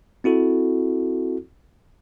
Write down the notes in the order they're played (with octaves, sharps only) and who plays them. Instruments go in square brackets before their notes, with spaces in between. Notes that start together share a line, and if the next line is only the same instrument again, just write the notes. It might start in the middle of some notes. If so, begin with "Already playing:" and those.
[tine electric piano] C4 E4 F#4 A4